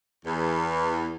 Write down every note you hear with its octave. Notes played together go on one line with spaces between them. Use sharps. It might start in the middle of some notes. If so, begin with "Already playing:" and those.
E2